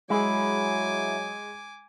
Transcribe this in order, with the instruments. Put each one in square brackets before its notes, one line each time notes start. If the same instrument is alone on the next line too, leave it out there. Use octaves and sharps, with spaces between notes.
[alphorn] F#3 [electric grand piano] G#3 G#4 [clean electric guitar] E4 [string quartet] G#5 D6